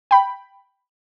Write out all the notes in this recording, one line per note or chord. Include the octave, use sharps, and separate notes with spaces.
G5 B5